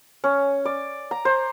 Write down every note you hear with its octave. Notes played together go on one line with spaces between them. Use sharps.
C#4
D5
A#5
C5